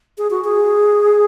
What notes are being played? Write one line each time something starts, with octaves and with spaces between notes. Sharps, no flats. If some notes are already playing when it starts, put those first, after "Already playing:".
G#4
F#4
G#4